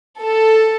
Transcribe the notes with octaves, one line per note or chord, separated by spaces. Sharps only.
A4